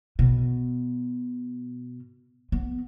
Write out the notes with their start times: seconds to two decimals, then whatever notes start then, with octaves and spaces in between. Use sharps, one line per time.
0.19 B2
2.52 B3